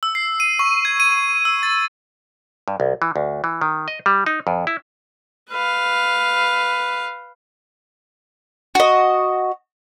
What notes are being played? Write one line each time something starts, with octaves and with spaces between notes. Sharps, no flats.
E6
C7
D#7
C#6
G#6
D#7
E6
A6
G2
C2
E3
D2
E3
D#3
D#5
G3
D#4
F2
E4
B4 F5
F#4 D#5